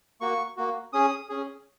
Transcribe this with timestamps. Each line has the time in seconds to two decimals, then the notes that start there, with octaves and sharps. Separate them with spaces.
0.21 A#3 F#4 C#6
0.57 A#3 F#4
0.93 C#4 G#4 D#6
1.29 C#4 G#4